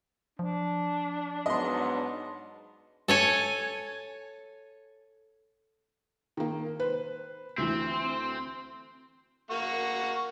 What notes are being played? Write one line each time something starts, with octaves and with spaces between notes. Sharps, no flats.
F3 D4
G#2 F#3 B3 D#5 C6
A4 C#5 G#5
D#3 A#3
B4 C5
D2 E3 C4
A#3 F#5 C#6